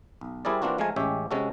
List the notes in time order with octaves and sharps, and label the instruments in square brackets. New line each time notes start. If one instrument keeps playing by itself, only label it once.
[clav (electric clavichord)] B1
G3 C4 E4 G#4 A#4 D5
E3 A#3 C4 D4 F4 F#4
F3 G#3 A3 F5 G#5 A#5
A1 G#3 C#4 G4 C#5 E5
C3 G#3 C#4 F#4 A4